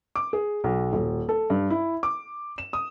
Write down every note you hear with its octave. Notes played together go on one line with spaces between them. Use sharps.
D6
G#4
B1
D#1
A4
G2
E4
D6
E7
D#6